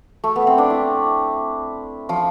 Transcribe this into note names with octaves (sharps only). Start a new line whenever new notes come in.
A3
B3
C4
D4
E4
F3 F4